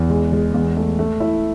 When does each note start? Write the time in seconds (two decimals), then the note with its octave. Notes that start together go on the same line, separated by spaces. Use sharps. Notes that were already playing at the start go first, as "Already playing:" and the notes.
Already playing: E2
0.10 G#3
0.32 G#3
0.54 E2
0.77 A3
0.99 A3
1.20 E4